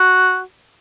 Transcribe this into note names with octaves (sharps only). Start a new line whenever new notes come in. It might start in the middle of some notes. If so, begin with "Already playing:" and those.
Already playing: F#4